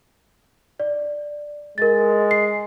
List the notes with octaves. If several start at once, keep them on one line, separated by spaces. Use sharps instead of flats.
D5
G#3 A#4 A6
C7